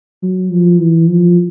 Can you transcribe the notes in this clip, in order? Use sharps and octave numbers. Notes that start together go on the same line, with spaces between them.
F#3
F3
E3
F3